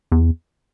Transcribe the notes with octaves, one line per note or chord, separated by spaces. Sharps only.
E2